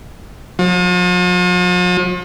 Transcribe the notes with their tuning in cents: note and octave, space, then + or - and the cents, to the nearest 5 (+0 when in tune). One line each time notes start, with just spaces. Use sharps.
F3 +45